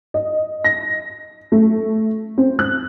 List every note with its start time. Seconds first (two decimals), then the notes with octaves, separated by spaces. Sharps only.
0.14 D#5
0.64 A#6
1.52 A3
2.38 C4
2.59 F#6